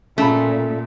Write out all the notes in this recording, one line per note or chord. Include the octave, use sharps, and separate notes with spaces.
A#2 C#3 A3 B5